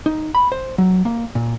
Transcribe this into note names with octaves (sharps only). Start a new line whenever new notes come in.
D#4
B5
C5
F#3
A#3
A#2